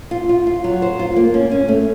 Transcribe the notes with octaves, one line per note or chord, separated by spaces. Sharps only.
F4
F4
F4
F#3
C5
F4
A#3
C#4
C#4
A3